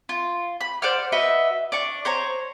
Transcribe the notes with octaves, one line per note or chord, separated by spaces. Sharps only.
F4
B5
C5 D5 F#5 F6
F#4 B4 D#5 E5
D4 C#6
C5 C#5 A#5